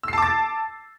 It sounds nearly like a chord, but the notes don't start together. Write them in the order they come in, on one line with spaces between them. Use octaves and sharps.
E6 C7 A5 D6 A6